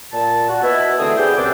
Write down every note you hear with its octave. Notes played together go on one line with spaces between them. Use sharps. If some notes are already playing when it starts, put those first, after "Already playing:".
A#2 A5
F#4
B2 E4
D3 E3 A3 C4 G#4
B3 G4 G#4 D5 G5
C2 F#2 C3 C4 D4 D6